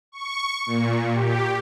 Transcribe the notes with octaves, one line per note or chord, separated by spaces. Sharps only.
C#6
A#2
G4